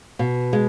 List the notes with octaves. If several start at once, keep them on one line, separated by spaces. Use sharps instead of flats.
B2
G#3